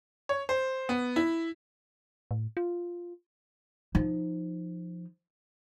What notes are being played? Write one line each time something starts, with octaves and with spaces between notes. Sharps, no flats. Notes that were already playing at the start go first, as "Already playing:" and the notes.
C#5
C5
B3
E4
A2
F4
F3 D#4